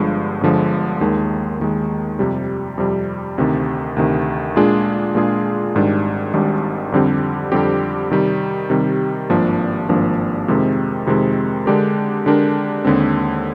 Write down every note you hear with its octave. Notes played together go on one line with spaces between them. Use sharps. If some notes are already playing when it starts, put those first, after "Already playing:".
Already playing: G1 G2 D3 F3 G#3
G1 G2 D3 F3 G#3
D#2 D#3 G#3
D#2 D#3 G#3
F2 C3 G3
F2 C3 G3
D2 C3 D#3
D2 C3 D#3
A#2 G#3 D4 F4 G#4
A#2 G#3 D4 F4 G#4
G#1 G#2 D#3 G3 D4
G#1 G#2 D#3 G3 D4
F2 D3 G3 C4 G4
F2 D3 G3 C4 G4
C3 D#3 G3
C3 D#3 G3
G#1 G2 F3 A#3 D4
G#1 G2 F3 A#3 D4
F2 C3 D#3 G#3 C4
F2 C3 D#3 G#3 C4
D3 G#3 D4 G4 A#4
D3 G#3 D4 G4 A#4
D#2 D3 G#3 C4